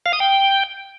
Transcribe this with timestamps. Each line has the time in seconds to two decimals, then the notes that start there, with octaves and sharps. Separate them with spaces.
0.06 F5
0.13 D#6
0.20 G5